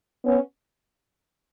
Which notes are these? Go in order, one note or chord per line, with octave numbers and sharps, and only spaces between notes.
B3 C#4